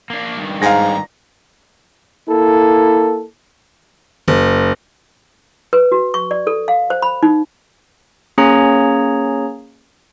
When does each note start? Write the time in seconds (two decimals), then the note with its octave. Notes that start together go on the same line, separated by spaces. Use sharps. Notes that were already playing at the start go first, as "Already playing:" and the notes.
0.10 A#3 D4
0.38 G2 D#3
0.62 G#2 F5 A#5 A#6
2.28 A#3 E4 A4
4.28 F#1
5.73 B4
5.92 F#4
6.14 C#6
6.31 D5
6.47 A4
6.68 F5
6.90 C5
7.02 B5
7.23 D#4
8.38 A#3 C#4 G#4 C#5 A#5